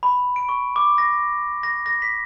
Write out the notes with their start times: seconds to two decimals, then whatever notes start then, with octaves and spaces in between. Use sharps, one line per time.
0.03 B5
0.36 D7
0.49 C#6
0.76 D6
0.98 A#6
1.63 A#6
1.86 A#6
2.02 B6